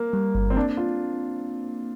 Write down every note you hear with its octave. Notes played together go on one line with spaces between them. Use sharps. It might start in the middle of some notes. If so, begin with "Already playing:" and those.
Already playing: A#3
G3
G1
C4
A#3 D4
F4